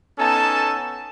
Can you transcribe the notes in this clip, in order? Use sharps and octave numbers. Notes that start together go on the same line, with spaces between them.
B3 C#4 D#4 A4 G#5 A5